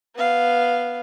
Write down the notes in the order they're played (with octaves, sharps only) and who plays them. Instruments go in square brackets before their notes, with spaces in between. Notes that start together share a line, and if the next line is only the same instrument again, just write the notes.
[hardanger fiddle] B3 F5